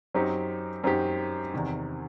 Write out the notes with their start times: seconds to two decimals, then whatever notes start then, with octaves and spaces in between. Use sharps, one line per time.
0.15 F#2 F#3 C4 D#4 G4
0.84 F#2 F#3 C4 D#4 G4
1.54 E2 C3 D#3